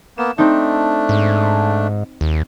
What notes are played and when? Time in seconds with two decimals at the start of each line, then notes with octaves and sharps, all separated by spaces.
0.18 A#3 B3 E7
0.38 A3 C4 D4 D#4
1.09 G#2
2.21 D#2